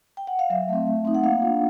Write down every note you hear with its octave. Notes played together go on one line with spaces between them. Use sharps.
G5
F#5
F5
F#3 E5
A3 C4
A3
C4 D#4
F#5
A#3 F5
D4 F4